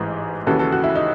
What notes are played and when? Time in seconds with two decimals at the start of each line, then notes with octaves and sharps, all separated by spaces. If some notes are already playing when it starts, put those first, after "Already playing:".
Already playing: A1 G#2 E3 G#4 C5
0.47 D#2 C#3 E3 F#4 A4
0.59 F#4 A4
0.72 F#4
0.84 E4
0.96 D#4